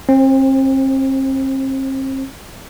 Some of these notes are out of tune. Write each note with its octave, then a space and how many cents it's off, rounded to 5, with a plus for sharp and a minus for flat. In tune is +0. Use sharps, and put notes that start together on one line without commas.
C4 +40 C5 +10